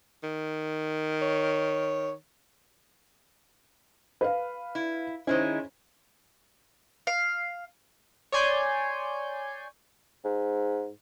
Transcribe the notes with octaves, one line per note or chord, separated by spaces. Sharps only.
D#3
C#5
B4 F5
E4
D#3 G#3 C#4 E4 C5
F5
C#5 D5 G#5 C6 G6
G#2